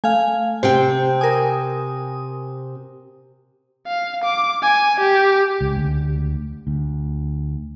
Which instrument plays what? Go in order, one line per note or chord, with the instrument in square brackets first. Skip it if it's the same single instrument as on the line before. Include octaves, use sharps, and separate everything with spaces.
[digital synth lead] A3 [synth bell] F5 G#5
[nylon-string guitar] C3 C4 G5 [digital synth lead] G4 [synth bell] C5
[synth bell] A#4 G#5 [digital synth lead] D#6
[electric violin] F5
D6
G#5
G4
[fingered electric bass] C#2
D2
D2